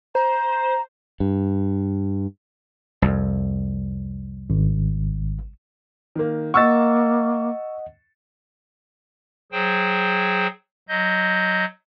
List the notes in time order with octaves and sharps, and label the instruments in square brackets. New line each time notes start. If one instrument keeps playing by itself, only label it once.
[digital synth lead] C5 [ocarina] A#5
[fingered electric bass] G2
[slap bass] C2 F2
[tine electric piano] G#1
[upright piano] D#3 A#3
[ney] A#3 [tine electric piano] D#5 F#5 [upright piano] C#6 E6 A6
[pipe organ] F#3 G#4 C5 G5
F#3 D#5 G6